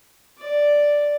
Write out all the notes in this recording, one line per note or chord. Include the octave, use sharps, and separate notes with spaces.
D5